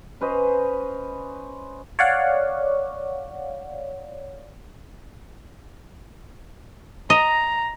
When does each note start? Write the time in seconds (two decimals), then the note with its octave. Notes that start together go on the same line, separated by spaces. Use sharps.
0.21 C#4 B4 C5 D#5
1.99 C#5 D5 F5 F#5
7.10 D#5 A#5